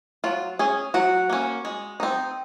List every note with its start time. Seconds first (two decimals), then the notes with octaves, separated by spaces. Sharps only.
0.24 F#3 F4
0.59 C#4 G#4
0.94 F#3 F#4
1.30 A#3 C#4
1.65 G#3
2.00 C4 D#4